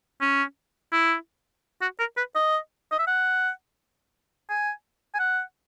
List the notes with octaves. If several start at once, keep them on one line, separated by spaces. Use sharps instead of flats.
C#4
E4
F#4
A#4
B4
D#5
D#5
E5
F#5
G#5
G#5
F#5